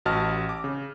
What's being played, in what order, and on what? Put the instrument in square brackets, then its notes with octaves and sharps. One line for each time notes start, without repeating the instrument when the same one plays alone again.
[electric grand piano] A1 F#4 D#5 A5 F6
D6
C#3